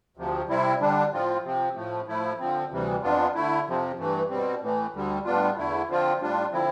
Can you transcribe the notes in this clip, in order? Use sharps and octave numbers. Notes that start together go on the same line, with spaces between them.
D2 C3 F3
C3 G3 C4 E4
D3 G3 D4
A2 F3 C4 F4
C3 F3 C4
A2 F3 A3
A2 F3 A3 E4
D3 F3 C4
D2 C3 E3 G3
F2 E3 B3 D4 F4
D3 A3 E4
F2 C3 F3 C4
G2 E3 A3
B2 G3 C4
A2 E3 A3
D2 D3 G3
A2 G3 B3 D4 F4
E2 D3 A3 E4
D3 F3 C4 F4
A2 G3 D4 F4
D3 F3 C4 E4